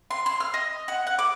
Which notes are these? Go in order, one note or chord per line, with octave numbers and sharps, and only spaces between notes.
C6
C6
F6
D#5
F#5
F#5
D6